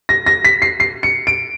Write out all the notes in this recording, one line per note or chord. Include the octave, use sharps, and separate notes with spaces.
A#6
A#6
B6
C7
C7
C#7
D7